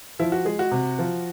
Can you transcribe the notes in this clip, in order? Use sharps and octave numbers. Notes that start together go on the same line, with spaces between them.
F3 E4
F#4
G#3 G#4
F#4
C3
F3